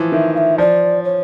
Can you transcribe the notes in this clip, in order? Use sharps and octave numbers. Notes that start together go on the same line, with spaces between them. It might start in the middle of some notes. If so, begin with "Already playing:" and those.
Already playing: E3 F3
D#3 E5
F5
E5
F3 D5
C#5